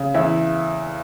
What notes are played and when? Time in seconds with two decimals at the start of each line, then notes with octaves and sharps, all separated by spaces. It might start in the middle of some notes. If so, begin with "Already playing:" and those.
Already playing: C#3
0.14 E2 E4 E5